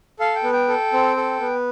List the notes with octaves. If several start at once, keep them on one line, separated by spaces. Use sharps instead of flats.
A4 F5
G5
B3
G5
A4
C4
A4
B3